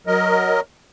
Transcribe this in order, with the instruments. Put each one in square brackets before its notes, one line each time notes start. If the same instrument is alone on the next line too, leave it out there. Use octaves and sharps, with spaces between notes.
[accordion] F#3 A#4 D#5